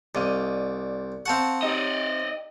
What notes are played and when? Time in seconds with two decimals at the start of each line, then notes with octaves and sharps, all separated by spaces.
0.15 C2 D5 D#5 F5
1.26 C4 F5 F#5 A5 C#6
1.63 D#4 G4 D5 D#5